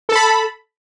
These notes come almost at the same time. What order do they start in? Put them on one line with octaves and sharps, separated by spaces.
A4 A5 B5